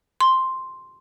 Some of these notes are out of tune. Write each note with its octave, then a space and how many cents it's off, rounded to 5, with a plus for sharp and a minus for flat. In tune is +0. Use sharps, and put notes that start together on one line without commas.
C6 +0